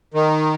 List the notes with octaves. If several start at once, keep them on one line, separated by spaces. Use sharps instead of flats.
D#3